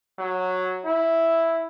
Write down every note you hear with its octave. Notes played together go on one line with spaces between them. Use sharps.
F#3
E4